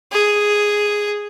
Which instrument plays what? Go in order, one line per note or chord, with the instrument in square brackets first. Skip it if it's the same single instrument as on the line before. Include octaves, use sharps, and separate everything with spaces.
[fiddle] G#4